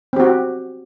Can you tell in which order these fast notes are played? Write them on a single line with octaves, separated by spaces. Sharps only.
C4 G4 F#4